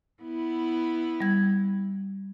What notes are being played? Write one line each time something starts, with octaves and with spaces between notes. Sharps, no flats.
B3 E4
G3 G#6